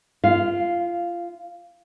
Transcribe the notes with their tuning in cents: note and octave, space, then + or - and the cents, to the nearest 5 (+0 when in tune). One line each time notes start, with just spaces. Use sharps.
F4 -25 F5 -5